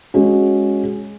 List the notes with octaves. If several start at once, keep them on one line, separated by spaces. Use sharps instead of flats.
G#3 C#4 F#4